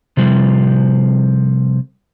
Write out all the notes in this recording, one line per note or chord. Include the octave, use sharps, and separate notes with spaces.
C3 F3 G3